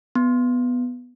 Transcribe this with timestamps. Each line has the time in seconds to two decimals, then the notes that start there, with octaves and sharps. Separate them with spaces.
0.15 B3